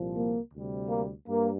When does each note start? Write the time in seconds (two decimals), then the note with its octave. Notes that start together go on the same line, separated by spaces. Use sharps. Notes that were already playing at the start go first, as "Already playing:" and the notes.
Already playing: C2 A#2 F3
0.16 A#3
0.52 D2 C3 G3
0.89 A#3
1.27 G2 A#3